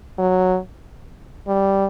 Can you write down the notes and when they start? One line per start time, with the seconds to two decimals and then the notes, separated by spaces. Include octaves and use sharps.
0.18 F#3
1.48 G3